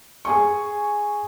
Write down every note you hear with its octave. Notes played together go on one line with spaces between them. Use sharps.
G#4 G#5 C#6